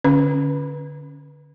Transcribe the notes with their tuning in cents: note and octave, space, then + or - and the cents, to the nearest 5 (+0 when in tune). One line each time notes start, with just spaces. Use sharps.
D3 +0 C#4 +0 B4 -15